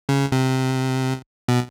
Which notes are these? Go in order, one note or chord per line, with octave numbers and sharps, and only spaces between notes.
C#3
C3
B2